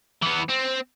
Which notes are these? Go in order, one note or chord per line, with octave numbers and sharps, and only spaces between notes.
E3 B3
C4